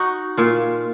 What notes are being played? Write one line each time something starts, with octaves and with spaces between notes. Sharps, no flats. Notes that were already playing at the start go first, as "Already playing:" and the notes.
Already playing: D#4 F#4
A#2 F4